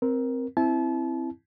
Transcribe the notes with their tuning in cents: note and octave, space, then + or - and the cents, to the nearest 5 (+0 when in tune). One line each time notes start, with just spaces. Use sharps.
C4 +0 A#4 +10
C4 +0 E4 +0 A5 -35